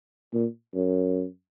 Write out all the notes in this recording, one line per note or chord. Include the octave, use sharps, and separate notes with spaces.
A#2
F#2